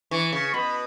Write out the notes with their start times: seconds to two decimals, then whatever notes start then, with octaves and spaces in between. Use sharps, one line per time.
0.11 E3 C#6
0.32 C#3
0.54 B2 B5